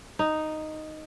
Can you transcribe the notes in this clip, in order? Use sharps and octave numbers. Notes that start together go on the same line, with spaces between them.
D#4